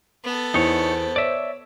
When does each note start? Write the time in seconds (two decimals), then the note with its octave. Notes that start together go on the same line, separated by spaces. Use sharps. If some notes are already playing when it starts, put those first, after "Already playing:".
0.24 B3 A4
0.54 E2 D#4 C5 C#5
1.16 C#5 D5 E5